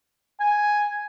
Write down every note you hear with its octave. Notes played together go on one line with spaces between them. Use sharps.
G#5